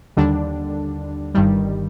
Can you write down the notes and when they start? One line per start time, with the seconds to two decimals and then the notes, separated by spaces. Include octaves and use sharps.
0.17 D#2 D3 G3 D4
1.35 G1 G2 D#3 G3